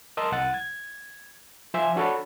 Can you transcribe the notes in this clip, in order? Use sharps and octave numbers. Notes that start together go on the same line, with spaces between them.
A#4 D#5 A5 C6 E6
C2 F#5 A6
G#6
F3 C5 E5 G#5
D4 F#4 A4 C#5 B5